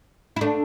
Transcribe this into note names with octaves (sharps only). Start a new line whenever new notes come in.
E4
A3 D4